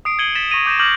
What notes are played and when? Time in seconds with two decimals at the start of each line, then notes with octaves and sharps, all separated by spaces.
0.05 D#6 C7 D7
0.19 G#6 C7 C#7 D#7 F#7 G7
0.35 A6 B6 E7
0.50 C#6 A#6 D#7 F7
0.66 D6 G6 A#6 E7
0.79 D6 F6 G6 A#6 F#7